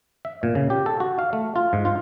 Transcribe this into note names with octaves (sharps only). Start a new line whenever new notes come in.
E5
A#2
C#3
G4
A4
F#4
F5
A3
F4
G#2
F4